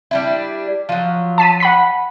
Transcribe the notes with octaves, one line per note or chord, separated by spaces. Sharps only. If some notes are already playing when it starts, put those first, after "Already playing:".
G3 D4 E4
F3 F#3
A5 B6 D#7
F#5 B5 B6